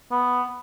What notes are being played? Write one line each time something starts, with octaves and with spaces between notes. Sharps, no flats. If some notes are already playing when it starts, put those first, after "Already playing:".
B3